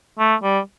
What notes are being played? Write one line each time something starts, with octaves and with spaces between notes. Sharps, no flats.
A3
G3